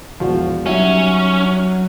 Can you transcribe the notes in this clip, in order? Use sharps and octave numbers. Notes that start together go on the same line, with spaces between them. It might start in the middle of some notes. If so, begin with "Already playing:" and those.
E1 E3 F3 F#4
F#3 G3 C#4 D#4 E5